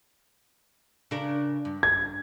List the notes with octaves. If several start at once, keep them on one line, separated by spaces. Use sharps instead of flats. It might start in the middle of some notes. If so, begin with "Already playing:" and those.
C#3 D4 A#4
G2
G#6